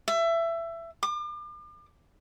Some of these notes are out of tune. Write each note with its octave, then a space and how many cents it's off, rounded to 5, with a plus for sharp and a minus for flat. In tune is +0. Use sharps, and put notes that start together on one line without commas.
E5 +20
D6 +40